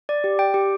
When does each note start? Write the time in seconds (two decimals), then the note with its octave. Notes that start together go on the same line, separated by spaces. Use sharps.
0.09 D5
0.24 G4
0.39 G5
0.54 G4